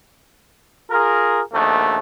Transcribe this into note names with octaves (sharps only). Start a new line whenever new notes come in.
F4 G#4 A#4
A#1 D#2 B2 A3